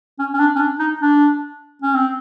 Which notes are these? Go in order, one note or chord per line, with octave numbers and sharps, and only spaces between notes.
C#4
C#4
D4
C#4
D4
D#4
D4
C#4
C4